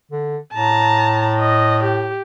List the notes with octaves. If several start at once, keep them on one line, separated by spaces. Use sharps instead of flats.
D3
A2 A5 A#5
D#5
G4